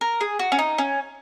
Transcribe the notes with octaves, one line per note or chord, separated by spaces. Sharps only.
A#4
G#4
F#4
C#4
D#4
C#4